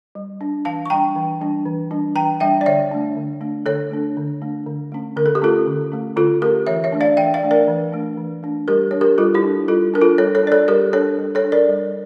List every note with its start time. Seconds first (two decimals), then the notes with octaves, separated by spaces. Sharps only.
0.15 G3
0.41 D4
0.65 E3 F5 A5
0.86 C#6
0.90 G3 D4 G5 A#5
1.16 E3
1.41 G3 D4
1.66 E3
1.91 G3 D4
2.15 E3 G5 A#5
2.40 G3 D4 E5 G5
2.61 D5
2.66 D3 C#5 E5
2.91 A3 D4
3.16 D3
3.41 A3 D4
3.66 D3 A4 C#5
3.91 A3 D4
4.17 D3
4.42 A3 D4
4.66 D3
4.92 A3 C#4
5.16 D3 A#4
5.26 A4
5.35 G4
5.42 A3 C#4 F4 A4
5.67 D3
5.92 A3 C#4
6.17 D3 F4 A4
6.42 A3 C#4 G4 A#4
6.67 E3 C#5 E5
6.84 C#5 E5
6.92 A3 D4
7.01 D5 F5
7.17 E3 E5 G5
7.34 D5 F5
7.43 A3 D4
7.51 A#4 D5
7.67 E3
7.92 A3 D4
8.18 E3
8.43 A3 D4
8.68 G3 G4 A#4
8.91 D4 C#5
9.01 G4 A#4
9.18 G3 F4 A4
9.34 E4 G4
9.43 D4
9.68 G3 F4 A4
9.94 D4 A#4
10.02 F4 A4
10.18 G3 A4 C#5
10.35 A4 C#5
10.44 D4 D5
10.52 A4 C#5
10.68 G3 G4 A#4
10.93 D4 A4 C#5
11.18 G3
11.35 A4 C#5
11.44 D4
11.52 A#4 D5
11.69 G3